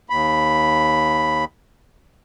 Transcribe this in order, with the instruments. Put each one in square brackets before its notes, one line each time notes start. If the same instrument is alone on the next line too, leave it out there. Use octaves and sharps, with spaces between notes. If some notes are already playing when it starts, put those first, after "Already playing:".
[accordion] D#2 B5